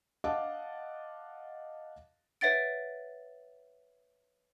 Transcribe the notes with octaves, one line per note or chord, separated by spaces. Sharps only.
D#5 F5 F#5 A5 D6
B4 C#5 E5 F#5 A6 D7